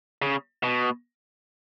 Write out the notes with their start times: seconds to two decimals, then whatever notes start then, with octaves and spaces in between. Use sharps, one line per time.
0.22 C#3
0.63 B2